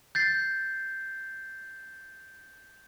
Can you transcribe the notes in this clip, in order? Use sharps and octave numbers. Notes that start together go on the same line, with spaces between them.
G6 A6 C7